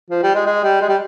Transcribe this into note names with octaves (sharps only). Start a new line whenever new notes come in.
F3
G3
G#3
G#3
G3
G#3
G3